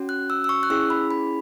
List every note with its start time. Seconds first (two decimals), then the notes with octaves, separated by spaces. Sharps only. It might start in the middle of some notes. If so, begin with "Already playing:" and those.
Already playing: C#4 F#4
0.09 F#6
0.30 E6
0.44 E6
0.49 C#6
0.63 F#6
0.70 C#4 E4 G#4 E6
0.90 B5
1.11 B5